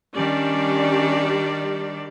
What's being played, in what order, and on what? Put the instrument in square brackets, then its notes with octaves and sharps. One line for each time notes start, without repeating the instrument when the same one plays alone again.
[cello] D#3 D4 [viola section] G3 G4 D5 [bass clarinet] C#4